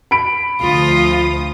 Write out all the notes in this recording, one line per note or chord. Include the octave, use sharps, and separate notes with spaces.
B5 D7
D2 F3 F4 D#6